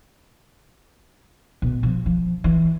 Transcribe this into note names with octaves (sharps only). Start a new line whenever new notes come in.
B2
F3
F3
E3